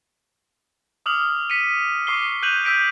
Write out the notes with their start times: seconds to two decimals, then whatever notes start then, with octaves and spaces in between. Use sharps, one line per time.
1.06 D6 D#6 F6 F#7
1.50 B6 C#7 D#7
2.07 C#6 D6 C7 G7
2.43 F#6 G6 D#7 F7 F#7
2.65 E6 G6 B6 D7